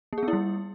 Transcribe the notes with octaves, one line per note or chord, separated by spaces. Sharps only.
A#3
G#4
B3
E4
G3